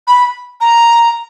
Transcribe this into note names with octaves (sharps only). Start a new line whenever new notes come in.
B5
A#5